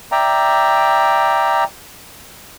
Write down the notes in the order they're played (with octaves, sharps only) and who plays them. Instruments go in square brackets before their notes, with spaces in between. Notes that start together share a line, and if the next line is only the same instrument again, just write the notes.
[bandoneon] D5 E5 G5 A#5